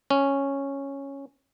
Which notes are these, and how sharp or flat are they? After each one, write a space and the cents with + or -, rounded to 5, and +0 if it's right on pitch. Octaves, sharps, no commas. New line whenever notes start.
C#4 -5